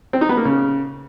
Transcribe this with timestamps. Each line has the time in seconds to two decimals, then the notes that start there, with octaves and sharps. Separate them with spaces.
0.13 C4
0.21 D#4
0.29 B3
0.37 A#3
0.45 C#3